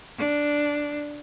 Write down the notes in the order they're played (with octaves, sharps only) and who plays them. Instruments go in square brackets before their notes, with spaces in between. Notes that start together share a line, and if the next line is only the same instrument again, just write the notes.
[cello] D4